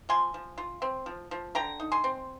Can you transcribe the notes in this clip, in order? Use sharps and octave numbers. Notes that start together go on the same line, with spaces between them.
F3 G#5 C6
F3
F4
C4
F3
F3
D3 G5 A#5
D#4
G#5 C6
C4